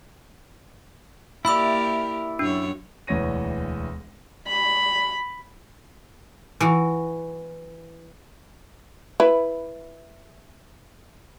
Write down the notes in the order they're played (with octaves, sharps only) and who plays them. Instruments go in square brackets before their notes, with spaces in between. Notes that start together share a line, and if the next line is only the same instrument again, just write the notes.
[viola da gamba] A#3 G4 A#4 [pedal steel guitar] E4 D5 [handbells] E5 B5 E6
[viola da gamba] F#2 C#5 [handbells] D4
[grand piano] E1 D2 E3 C#5 A#6 D#7
[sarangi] B5
[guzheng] E3 F#4
[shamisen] E4 B4